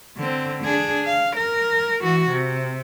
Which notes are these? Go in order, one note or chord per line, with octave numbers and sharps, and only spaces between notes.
D3 C4
D4 G#4
F5
A#4
E3 F#4
C3